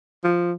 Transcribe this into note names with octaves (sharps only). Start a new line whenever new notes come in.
F3